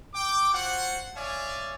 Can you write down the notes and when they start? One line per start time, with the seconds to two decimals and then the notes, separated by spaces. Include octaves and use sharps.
0.14 G5 D6
0.53 F4 F#4 C5 F#5
1.16 C#5 D5 E5 F5 G#5